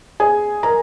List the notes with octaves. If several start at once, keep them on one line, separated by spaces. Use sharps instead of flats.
G#4 G#5
A#4 A#5